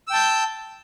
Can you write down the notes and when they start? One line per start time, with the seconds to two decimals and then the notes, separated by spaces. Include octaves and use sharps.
0.08 E6
0.10 G5
0.13 A5
0.16 G6